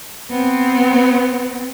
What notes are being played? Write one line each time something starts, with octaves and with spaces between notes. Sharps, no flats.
B3 C4